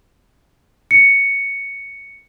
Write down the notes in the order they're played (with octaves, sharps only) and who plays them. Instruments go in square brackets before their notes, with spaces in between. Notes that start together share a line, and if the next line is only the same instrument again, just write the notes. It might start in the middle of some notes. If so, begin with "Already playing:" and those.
[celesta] C#7